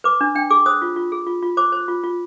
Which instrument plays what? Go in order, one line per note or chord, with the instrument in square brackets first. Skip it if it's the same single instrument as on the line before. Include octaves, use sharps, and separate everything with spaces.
[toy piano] B4 D6
D4
D4 G5
G#4 D6
C5 D#6
F4
F4
G#4
F4
F4
C5 D6
C5
F4
F4